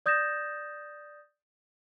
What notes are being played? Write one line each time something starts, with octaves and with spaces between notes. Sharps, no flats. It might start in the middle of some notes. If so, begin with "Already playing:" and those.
D5 D#6 G6 A6 A#6 E7